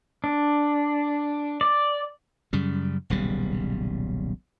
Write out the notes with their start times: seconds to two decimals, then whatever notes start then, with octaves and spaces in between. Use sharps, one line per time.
0.24 D4
1.61 D5
2.53 F#2 C#3 G3
3.10 D#1 B1 C#3 G3